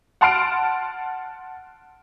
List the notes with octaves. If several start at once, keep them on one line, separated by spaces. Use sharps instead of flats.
F#5 A5 C6 F6 C7 D7